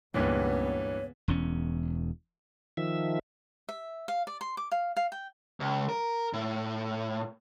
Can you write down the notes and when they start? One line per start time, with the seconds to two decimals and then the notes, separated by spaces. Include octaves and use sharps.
0.14 C#2 G2 A#2 C#3 E3 B3 C#5
1.28 E1 E2 C#4
2.77 D#3 F3 E5
3.69 E5
4.08 F5
4.27 D5
4.41 C6
4.57 D6
4.72 F5
4.96 F5
5.12 G5
5.60 C#2
5.89 A#4
6.33 A2